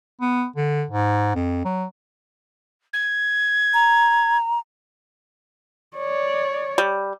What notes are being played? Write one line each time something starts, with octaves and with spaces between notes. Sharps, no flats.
B3
D3
G#2
F2
F#3
G#6
A#5
C#5 D5
G3